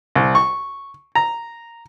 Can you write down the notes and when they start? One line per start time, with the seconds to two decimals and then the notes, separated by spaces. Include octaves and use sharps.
0.15 C2
0.35 C#6
1.15 A#5